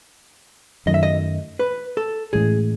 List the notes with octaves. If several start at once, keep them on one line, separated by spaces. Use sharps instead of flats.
F#2 D#3 F#3 A3 D#5
E5
D#5
B4
A4
A2 E3 G#3 C#4 G#4